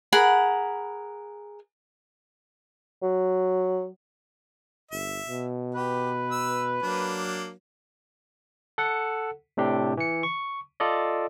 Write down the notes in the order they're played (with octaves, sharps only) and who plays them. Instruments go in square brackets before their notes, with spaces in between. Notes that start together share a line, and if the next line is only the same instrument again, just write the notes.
[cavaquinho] G#4 A#4 F#5 B5
[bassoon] F#3
[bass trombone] G1 [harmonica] E5
[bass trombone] B2
[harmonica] G4 [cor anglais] B4
[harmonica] E6
[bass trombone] F#3 [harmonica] A#3 D4
[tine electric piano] A4 F#5
A2 C3 D4 G4
E3 C#7
C#6
F4 A4 D5 D#5